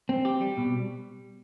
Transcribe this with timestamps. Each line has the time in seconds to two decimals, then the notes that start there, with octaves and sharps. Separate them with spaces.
0.09 C4
0.25 G4
0.41 G3
0.57 B2